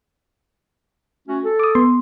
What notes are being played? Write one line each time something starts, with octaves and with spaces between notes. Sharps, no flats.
A3 C#4 F#4
A4
D6 D#6
B3 C6